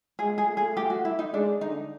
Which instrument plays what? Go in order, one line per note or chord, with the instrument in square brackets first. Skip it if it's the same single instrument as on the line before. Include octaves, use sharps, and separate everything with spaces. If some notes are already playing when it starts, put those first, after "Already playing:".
[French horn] G#3 [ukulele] G#4
[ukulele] G#4
[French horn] A3
[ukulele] G#4
G4
F#4
E4
D#4
[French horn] G#3 [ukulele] D4
[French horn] D3 [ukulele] D#4